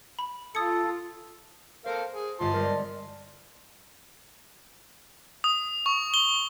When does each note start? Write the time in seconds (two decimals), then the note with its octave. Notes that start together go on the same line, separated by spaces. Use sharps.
0.19 B5
0.55 F4 A4 D#6 G#6 C#7
1.86 A4 A#4 C5 F5
2.14 G#4
2.40 G1 G2 F4 A5 C6
2.54 G3 G#3 A#4
5.44 D#6
5.86 C#6
6.14 G7